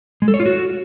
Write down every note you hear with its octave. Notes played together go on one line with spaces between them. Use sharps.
G#3
A4
C#5
F4
F#4